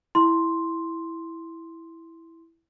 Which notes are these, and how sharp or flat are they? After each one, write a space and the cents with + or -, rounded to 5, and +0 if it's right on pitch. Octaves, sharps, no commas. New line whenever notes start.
E4 +0 C6 +0